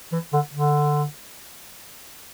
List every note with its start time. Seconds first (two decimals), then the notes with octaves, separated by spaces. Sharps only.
0.12 E3
0.33 D3
0.54 D3